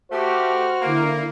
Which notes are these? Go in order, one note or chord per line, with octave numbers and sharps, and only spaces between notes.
A3 F#4 G4 C5 F6
D3 A#3 E4